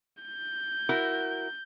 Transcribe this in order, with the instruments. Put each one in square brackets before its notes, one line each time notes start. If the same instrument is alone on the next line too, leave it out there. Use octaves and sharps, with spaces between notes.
[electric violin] G6
[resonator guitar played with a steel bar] E4 F#4 A#4